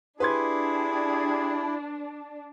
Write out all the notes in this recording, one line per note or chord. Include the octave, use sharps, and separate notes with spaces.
D4 E4 G4 G#4 B4 C6 G#6